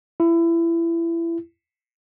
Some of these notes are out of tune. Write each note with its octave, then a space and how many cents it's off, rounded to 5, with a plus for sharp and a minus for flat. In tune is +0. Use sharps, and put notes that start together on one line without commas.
E4 +25